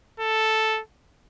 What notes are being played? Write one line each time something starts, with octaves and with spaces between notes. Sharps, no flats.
A4